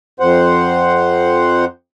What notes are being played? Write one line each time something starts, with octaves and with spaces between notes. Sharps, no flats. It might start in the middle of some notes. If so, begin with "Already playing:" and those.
F2 C5 F#5